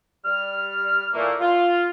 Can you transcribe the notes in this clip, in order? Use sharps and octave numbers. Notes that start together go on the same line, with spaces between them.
G3 F6
A#2 E3 A3 A#3
F4